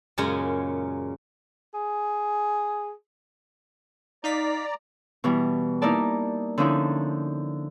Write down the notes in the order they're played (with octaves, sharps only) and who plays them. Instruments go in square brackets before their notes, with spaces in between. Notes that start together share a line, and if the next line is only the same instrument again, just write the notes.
[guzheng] F#2 A#2 C#3 G#3 G#5 A#5
[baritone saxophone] G#4
[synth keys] D#4 F5 B6 [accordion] D5 A#5
[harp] B2 E3 G3
A#3 D#4 E4 A#4 D5 A5
D3 F3 C#4 D#4 E4